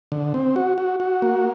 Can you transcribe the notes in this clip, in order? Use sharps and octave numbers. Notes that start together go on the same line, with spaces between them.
D3
C4
F#4
F#4
F#4
A#3